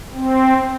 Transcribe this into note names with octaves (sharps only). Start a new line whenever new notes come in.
C4